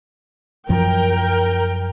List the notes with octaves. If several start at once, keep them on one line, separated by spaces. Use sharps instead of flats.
F#2 F3 F#3 A#4 G5